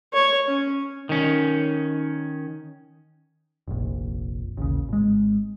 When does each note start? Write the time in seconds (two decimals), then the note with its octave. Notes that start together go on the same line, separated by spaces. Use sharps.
0.13 C#5
0.48 C#4
1.09 D#3 C#4
3.68 F1 A#1
4.57 A1 D#2 C#3
4.89 G#1 G#3